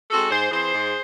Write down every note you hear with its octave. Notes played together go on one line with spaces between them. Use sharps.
G#3 C4 F#4 A4
G#2 G#4 C5
E3 C4 G#4 C5
G#2